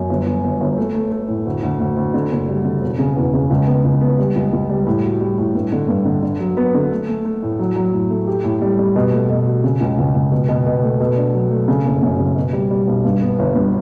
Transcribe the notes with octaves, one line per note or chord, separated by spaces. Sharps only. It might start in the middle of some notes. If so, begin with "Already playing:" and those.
Already playing: F#2
G1
G1
G1
G1
A3
A3
A3
A2
D2
D2
D2
D2
D3
F#1
G3
D3
E1
C#3
E2
C#3
C#2
B3
C#2
B3
G3
C#2
C#2
G3
A2
F#4
G3
A2
G2
D3
G2
D3
D3
F#3
B3
D3
A3
A3
A3
A2
F#3
F#3
A2
A3
G4
A2
G3
G3
B2
A3
B2
F#4
C#3
C#2
C#2
C#2
B2
B2
B2
A3
B2
D4
F#3
A3
C#3
F#1
F#2
C#3
B2
G3
G3
B1
G2
B3
G1
G2